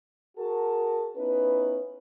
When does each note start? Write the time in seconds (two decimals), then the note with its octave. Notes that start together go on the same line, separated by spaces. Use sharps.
0.38 F#4 G#4 A#4 A5
1.16 B3 C#4 D#4 E4 B4